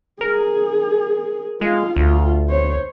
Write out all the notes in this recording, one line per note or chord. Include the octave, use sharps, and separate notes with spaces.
G#4 A#4
G#3 F4 F5
D2 A3 F4
C5 C#5